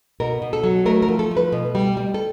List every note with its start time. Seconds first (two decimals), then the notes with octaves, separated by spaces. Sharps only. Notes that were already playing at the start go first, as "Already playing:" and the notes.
0.20 B2 A#4
0.42 B2
0.53 A4
0.63 F#3
0.86 A3 A#4
1.02 A#4
1.09 F3
1.19 A4
1.31 A3
1.37 B4
1.52 B2
1.75 G3
1.97 G3
2.14 A4